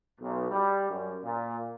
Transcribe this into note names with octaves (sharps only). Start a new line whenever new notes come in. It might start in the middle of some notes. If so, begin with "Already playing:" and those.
B1
G3
F#2
A#2